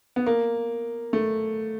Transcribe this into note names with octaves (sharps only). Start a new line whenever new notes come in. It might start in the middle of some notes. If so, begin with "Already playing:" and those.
B3
A#3
A3